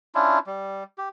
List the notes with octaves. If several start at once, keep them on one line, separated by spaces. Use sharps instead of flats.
C#4 D4 E4 F4
G3
G4